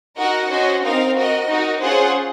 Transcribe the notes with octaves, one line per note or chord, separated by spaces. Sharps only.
D#4 F#4 A#4 D#5 F#5
C#4 F#4 C5 D#5
C4 D#4 A#4 F5
F#4 A#4 D#5
D#4 F#4 A#4
C#4 F4 G#4 C5 F#5